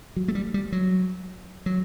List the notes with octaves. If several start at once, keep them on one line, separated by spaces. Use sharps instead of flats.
F#3
A3
G3
G3
F#3
F#3